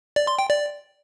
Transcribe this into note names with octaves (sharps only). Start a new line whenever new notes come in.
D5
C6
G5
D5